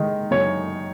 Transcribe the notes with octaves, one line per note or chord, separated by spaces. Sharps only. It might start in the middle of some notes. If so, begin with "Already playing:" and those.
Already playing: D#3 G#3 D#4
F#2 C#5